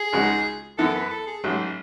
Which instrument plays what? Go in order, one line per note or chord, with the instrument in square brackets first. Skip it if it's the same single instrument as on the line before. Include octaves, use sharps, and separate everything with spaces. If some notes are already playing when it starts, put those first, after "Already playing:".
Already playing: [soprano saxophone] G#4
[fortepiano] C#2 C#3 G#3 D#4 F#4
[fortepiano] F#2 E3 B3 E4 [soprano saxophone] A4
[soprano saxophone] B4
A4
G#4
[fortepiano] A1 G#2 F#3